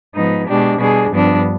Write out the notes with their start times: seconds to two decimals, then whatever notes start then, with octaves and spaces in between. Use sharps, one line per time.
0.15 G#2 F3 B3 D#4
0.47 B2 G#3 D4 G4
0.79 B2 G3 D4 G#4
1.11 G2 F3 B3 D4